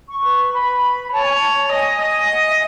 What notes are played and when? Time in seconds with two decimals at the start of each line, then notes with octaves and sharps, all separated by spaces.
0.09 C#6
0.23 B4
0.53 B4 B5
1.12 C#5 A5
1.23 G#5
1.33 A5
1.72 D#5 G#5
2.02 D#5
2.31 F#5
2.46 E5